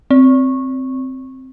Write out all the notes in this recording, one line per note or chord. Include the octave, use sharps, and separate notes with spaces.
C4